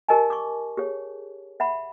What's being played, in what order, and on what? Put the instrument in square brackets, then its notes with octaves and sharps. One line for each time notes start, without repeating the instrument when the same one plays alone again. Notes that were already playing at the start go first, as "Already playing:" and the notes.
[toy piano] G4 A#4 D#5 G#5 A5
C#6 D6
G4 G#4 C#5
E5 F#5 B5